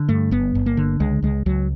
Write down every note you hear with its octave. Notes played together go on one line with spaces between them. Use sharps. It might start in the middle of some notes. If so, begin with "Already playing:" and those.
Already playing: D3
G2 A3
G1 B3
G1
A#3
D3
C#2 G#3
C#2 G#3
C#2 F#3